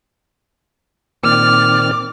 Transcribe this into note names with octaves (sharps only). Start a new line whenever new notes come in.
A#2 D#3 C4 D5 D6 F6